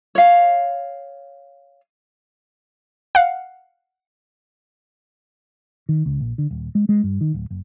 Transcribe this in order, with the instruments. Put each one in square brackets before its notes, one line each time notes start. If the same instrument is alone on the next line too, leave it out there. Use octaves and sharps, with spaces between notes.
[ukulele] C#5 F5
[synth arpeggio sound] F5 F#5
[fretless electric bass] D#3
C#2
A#1
D3
D#1
G#3
G#3
G2
D#3
D1
F#1